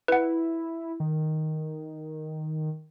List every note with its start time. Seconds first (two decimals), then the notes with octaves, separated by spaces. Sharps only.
0.08 E4 B4 F#5
1.00 D#3